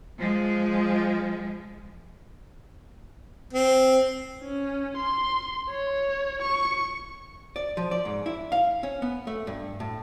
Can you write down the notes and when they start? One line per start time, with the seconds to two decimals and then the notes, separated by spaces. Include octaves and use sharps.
0.18 F3 G#3
3.53 C4
4.42 C#4
4.97 C6
5.70 C#5
6.42 C#6
7.56 D5
7.77 F3
7.91 D5
8.05 G#2
8.26 E4
8.52 F5
8.83 C#4
9.02 B3
9.27 A3
9.47 G2
9.80 A2